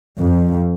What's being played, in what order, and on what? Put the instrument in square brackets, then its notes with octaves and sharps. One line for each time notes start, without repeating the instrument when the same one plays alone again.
[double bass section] F2